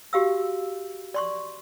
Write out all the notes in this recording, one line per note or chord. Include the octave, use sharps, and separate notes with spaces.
F#4 G4 F5 E6
D5 C6 C#6